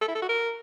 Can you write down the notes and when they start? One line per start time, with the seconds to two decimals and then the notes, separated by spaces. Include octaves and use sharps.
0.01 A4
0.08 E4
0.15 A4
0.22 F#4
0.29 A#4